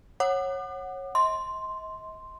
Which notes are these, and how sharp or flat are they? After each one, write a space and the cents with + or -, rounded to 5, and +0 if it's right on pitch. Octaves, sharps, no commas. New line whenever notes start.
C#5 -20 F#5 +0 D6 +45
D#5 +40 C6 +0